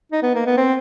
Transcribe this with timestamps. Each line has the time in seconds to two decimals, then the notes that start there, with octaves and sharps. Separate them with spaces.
0.12 D#4
0.23 B3
0.35 A#3
0.46 B3
0.57 C4